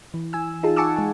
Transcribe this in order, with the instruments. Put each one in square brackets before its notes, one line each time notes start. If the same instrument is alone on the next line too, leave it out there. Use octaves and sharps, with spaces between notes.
[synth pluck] E3
E3 G#5 E6
D#4 F4 G#4 A5
F#5 G#5 A5 C#6 D6 E6
G#3 G#4